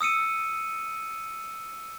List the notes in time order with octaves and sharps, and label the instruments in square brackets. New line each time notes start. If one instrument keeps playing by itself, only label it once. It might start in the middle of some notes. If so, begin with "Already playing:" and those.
[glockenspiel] D#6 E6 C#7 D#7